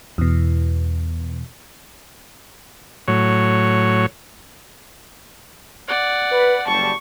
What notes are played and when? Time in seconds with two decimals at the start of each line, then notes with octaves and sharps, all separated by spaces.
0.18 E2 B2
3.08 A2 F#3 C#5
5.88 D5 F#5
6.32 B4
6.67 F#1 G3 A5 C#6